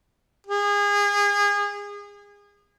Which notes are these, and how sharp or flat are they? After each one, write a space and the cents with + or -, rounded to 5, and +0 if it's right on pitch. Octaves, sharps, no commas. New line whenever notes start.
G#4 -30